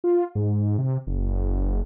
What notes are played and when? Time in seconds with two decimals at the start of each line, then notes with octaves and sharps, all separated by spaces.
0.04 F4
0.35 G#2
0.78 C3
1.07 F#1